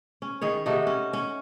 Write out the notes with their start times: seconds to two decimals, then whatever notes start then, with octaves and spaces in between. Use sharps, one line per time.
0.22 C#4
0.41 D#3 G#4 C#5
0.66 C3 A3 D#4 F#4
0.87 C#4
1.13 C#4